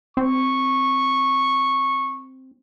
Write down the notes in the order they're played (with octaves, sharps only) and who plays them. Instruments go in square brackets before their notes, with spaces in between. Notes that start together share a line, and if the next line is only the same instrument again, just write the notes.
[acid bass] C4 [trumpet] C#6